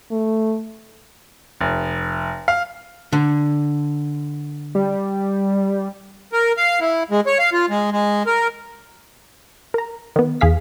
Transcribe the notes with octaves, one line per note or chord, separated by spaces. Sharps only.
A3
F1
F5
D3
G3
A#4
F5
E4
G#3
C#5
F5
F4
G#3
G#3
A#4
A#4 A#5
D#3 B3
E2 G#4 F5 B6